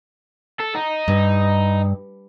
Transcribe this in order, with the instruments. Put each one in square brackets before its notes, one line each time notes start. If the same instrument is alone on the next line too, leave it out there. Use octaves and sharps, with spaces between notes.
[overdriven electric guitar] A4
D#4
[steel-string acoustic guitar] G2